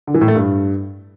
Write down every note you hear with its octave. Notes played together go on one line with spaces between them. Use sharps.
D3
E3
A2
A3
G2